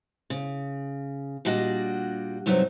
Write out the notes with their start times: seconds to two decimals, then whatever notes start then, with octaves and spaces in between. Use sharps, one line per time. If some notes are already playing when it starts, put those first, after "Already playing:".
0.30 C#3
1.45 A#2 G3 D4 F#4 D#5
2.46 G2 C3 F#3 D#4 E5